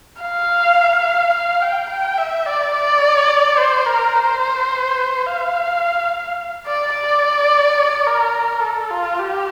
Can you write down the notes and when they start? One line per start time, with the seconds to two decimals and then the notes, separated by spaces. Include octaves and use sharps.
0.22 F5
1.34 F5
1.62 G5
1.90 G5
2.18 E5
2.46 D5
2.75 D5
3.58 C5
3.86 A#4
4.15 C5
5.26 F5
6.66 D5
6.94 D5
8.06 A#4
8.63 A4
8.90 F4
9.19 G4